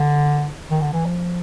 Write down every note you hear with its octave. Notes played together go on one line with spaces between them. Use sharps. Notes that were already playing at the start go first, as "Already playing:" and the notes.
Already playing: D3
D#3
D3
E3
F3